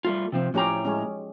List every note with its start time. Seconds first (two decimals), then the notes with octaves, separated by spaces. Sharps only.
0.05 G3 A3 F4
0.32 C3 F3 C4
0.54 A2 F3 C#4 G4 A#5
0.85 G#3 C#4